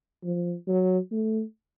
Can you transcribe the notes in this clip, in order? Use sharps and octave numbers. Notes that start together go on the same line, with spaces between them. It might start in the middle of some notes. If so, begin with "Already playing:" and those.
F3
F#3
A3